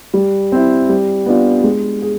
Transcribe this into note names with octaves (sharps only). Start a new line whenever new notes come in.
G3
C4 E4
G3
B3 D4 F4
G#3
G#4